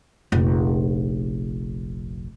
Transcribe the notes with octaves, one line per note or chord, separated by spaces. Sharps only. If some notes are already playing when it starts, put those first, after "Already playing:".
F1 A#1